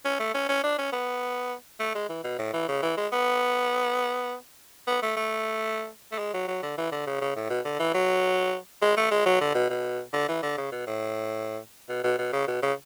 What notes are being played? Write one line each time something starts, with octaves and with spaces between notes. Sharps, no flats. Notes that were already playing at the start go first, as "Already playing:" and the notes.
C#4
A3
C#4
C#4
D4
C#4
B3
A3
G#3
E3
B2
A2
E3
C#3
E3
G#3
B3
B3
A3
A3
A3
G#3
F#3
F#3
D3
E3
D3
C#3
C#3
A2
B2
D3
E3
F#3
G#3
A3
G#3
F#3
D3
B2
B2
D3
E3
D3
C#3
B2
A2
B2
B2
B2
C#3
B2
C#3